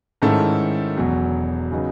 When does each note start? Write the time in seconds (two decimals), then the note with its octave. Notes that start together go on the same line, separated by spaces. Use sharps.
0.22 G#2 D#3 A3 C#4 E4 A4
0.97 E1 E2 B2 F#3
1.71 C#3 F#3 B3 D#4